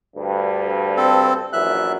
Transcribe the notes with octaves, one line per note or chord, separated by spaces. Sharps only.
D2 G2
C4 A4
A#1 F#2 E3 E5 F#6